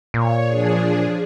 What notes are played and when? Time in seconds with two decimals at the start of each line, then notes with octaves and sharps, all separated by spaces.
0.14 A#2 C#5
0.48 F3 D4 G#4